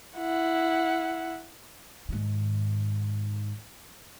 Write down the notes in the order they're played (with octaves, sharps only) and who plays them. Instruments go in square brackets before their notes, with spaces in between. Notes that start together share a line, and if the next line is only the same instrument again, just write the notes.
[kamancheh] E4 F#5
[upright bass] G#2 D#3